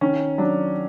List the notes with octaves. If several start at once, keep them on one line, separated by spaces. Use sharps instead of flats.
D#3 C#4
F#3 D4